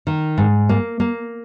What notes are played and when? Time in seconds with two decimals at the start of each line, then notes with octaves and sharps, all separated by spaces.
0.07 D#3
0.38 G#2
0.69 A#3
1.00 A#3